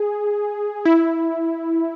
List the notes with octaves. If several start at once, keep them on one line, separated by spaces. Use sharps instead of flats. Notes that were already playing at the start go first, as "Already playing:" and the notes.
Already playing: G#4
E4